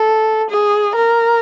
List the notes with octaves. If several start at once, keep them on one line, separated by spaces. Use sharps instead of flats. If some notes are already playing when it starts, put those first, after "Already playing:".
Already playing: A4
G#4
A#4